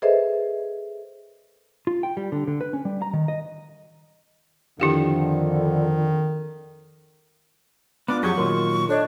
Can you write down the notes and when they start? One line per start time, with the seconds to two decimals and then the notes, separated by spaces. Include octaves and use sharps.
0.02 G#4 A4 B4 C5 D#5 E5
1.87 F4
2.03 G5
2.17 G3
2.32 D3
2.47 D3
2.61 B4
2.73 C#4
2.85 G3
3.02 A#5
3.13 D#3
3.28 D#5
4.80 F2 D3 D#3 E4 G4 F5
8.08 B3 D4 F4 D6
8.23 F2 F#3 G4 G#4 C#6
8.37 A#2 D#3 A#4 C6
8.89 D4 A4 C#5 D#5